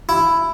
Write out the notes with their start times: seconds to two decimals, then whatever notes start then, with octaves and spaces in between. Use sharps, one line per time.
0.09 E4